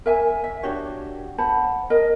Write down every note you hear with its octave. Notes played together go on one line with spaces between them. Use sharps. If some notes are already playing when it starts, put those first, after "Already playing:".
A#4 E5 G#5
E5
D4 F#4 G4 C#5
C5 F#5 A5 B5
A#4 D#5